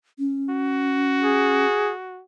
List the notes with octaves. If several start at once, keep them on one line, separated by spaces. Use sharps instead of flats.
C#4
F#4
G#4